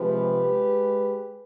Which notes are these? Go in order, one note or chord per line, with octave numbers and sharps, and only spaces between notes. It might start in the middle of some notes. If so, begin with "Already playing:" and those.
Already playing: C3 F3 G#3 G4 B4
G#3